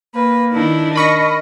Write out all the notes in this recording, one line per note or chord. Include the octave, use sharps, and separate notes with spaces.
A#3 B4
D#3 D4 E4
A#4 D#5 B5 C#6 A#6